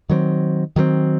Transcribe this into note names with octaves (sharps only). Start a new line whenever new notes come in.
D#3 F#3 A3 C4
D#3 F#3 A3 C4